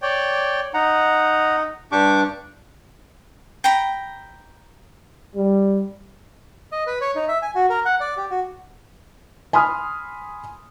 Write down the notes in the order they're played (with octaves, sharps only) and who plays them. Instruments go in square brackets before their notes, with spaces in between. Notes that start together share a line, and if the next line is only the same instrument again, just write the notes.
[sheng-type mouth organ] C#5 D5 G5
[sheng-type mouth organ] D#4 [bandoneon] F#5 A#5
[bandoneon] G2 D4 [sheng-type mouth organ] G4 C#6 D6
[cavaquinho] G5 A#5 B5
[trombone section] G3
[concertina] D#5
B4
C#5
D#4
E5
G#5
F#4
A#4
F#5
D5
G4
F#4
[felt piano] G#5 B5 C6 D#6 F6